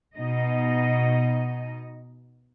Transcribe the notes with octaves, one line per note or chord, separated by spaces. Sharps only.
B2 D#4 D#5